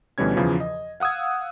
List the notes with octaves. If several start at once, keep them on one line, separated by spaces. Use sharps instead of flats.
D2 B2 E3 G3 C#4 G#6
E2 C#3 E3 F3
D#5
F5 F#5 D#6 E6 G#6